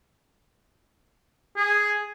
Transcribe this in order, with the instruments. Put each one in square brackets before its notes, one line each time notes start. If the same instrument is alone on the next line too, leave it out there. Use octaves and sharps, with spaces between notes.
[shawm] G#4